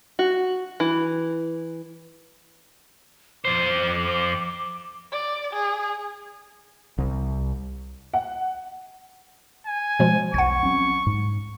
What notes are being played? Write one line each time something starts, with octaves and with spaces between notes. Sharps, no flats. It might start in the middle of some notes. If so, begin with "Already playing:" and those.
F#4
E3
F2 C5 D6
D5
G#4
C2
F#5
G#5
B2 F3 G#3
B1 E2 F#5 C#6 G#6
F#3 C4 C#4
G#2